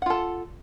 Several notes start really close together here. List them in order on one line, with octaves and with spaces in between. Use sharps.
F#5 F4 A4